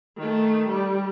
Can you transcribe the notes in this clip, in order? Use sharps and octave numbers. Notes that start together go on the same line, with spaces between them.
D#3 A3
G3